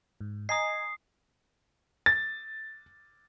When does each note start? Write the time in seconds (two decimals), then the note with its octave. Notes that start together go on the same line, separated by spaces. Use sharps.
0.21 G#2
0.49 D#5 G#5 A#5 D#6 C7
2.06 A6